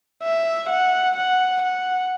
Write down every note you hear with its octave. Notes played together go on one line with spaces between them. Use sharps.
E5
F#5
F#5
F#5